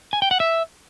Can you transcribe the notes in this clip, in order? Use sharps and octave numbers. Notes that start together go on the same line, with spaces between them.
G#5
G5
F#5
E5